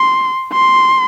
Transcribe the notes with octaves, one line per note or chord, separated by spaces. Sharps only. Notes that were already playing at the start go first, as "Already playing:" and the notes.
Already playing: C6
C6